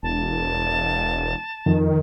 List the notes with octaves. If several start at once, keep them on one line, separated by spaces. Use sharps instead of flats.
E1 A5
F2 D#3